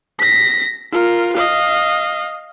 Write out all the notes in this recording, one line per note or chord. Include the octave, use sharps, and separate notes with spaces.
A#6 B6
F4 A#4
D#5 F5